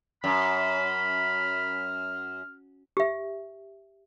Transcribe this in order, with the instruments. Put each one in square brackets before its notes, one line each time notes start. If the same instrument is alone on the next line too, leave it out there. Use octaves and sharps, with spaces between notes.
[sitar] F#2 [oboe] B5 [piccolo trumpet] F6
[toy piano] G4 E5